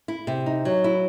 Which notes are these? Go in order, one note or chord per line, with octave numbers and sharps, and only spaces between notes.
E4
C3
D#4
F#3
E4